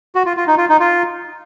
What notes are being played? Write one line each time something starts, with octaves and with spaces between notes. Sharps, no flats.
F#4
F4
F4
D#4
F4
D#4
F4